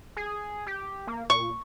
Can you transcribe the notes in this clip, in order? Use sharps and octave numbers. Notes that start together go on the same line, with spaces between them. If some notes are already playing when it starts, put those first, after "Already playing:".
G#4
G4
A#3
A#2 C#6